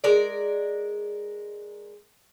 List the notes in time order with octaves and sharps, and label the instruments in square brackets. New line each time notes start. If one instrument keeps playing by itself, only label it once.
[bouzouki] G#3 A#4 D5